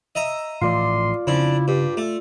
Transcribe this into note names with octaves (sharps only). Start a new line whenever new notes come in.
D#5 E5 A#5
A2 E3 F3 F4 D5 C6
F2 C#3 D4 E4
G2 G4
A3